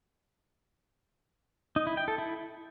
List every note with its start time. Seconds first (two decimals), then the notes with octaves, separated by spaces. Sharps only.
1.76 D#4
1.87 E4
1.97 G5
2.08 A4
2.18 E4